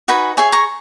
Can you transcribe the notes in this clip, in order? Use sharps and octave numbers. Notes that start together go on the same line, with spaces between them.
D#4 F#4 B4 G#5 B5
G#4 C#5 E5 G#5
A#5 C#6